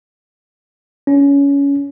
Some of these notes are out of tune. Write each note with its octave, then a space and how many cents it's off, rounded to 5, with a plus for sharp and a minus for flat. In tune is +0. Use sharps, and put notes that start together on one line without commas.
C#4 +20